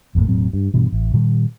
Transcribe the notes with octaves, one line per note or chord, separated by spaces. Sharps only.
G#1 F2 A2 A#3
E1 A2 F#3 C4
G2
G2 B2 E3
A1
A#2 D#3 G3